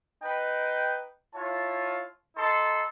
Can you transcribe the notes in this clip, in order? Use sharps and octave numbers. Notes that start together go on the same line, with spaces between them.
D#4 B4 G5
E4 F4 C#5 A5
D#4 A4 A5 C6